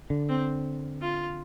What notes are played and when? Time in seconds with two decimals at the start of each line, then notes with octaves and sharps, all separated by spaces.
0.10 D3
0.29 C4
1.02 F4